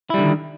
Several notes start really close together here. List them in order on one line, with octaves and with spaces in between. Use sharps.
E4 G3 D3 D#3